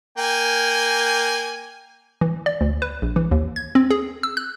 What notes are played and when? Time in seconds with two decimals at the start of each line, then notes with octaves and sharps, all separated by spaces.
0.18 A#3 G5 G#5
2.21 E3
2.46 D5
2.61 D2
2.82 B4
3.02 A#1
3.16 E3
3.31 D#2
3.56 G#6
3.75 C4
3.90 G#4
4.23 E6
4.37 F#6